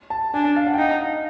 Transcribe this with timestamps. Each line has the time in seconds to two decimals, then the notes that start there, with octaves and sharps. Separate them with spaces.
0.10 A5
0.34 D4 G#5
0.56 F5
0.67 F#5
0.74 G5
0.78 D#4 F#5
1.01 F5